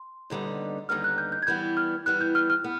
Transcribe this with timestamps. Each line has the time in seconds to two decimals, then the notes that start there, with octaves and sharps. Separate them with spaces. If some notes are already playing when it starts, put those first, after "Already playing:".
Already playing: C6
0.30 D#2 D3 G3 B3 D#4
0.89 D#2 D3 G3 B3 D#4 F6
1.04 F#6
1.18 G6
1.32 G6
1.42 G#6
1.47 E3 G3 B3 G6
1.77 F6
2.06 E3 G3 B3 F#6
2.21 G6
2.35 F6
2.50 F6
2.64 B3